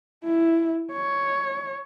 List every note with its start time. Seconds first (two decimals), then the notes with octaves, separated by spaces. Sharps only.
0.25 E4
0.93 C#5